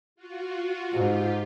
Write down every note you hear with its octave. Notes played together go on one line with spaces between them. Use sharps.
F4 F#4
G#2 F4 G4